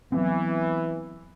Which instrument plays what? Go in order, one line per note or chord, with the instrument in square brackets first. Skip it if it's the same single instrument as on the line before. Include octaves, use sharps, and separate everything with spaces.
[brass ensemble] E3 [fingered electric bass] F#3 B3 C4